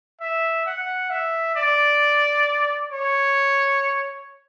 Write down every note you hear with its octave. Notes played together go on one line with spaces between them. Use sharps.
E5
F#5
E5
D5
C#5